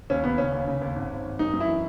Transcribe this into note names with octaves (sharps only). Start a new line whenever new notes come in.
D#2 C#4
D#2 B3
C#3 C#4
D#2
C#3
D#2
G#1
G#1
G#1
F#2 D#4
F#2
E4
E3